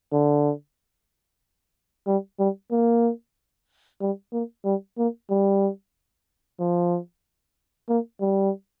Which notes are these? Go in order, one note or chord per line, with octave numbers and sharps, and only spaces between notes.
D3
G3
G3
A#3
G3
A#3
G3
A#3
G3
F3
A#3
G3